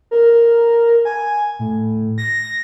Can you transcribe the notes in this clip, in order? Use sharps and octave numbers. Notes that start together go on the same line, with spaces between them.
A#4
G#5
A2
A#6